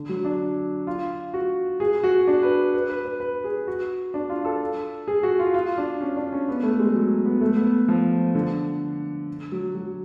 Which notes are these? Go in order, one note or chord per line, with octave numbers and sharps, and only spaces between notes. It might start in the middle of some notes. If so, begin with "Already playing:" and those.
Already playing: D3
F#3
D4
F4
F#4
G#4
F#4
D4
B4
B4
B4
B4
B4
G#4
F#4
D4
F4
A4
G#4
F#4
F4
F4
D4
C#4
D4
C#4
B3
A3
G#3
F#3
B3
A3
B3
F3
D3
F#3
F#3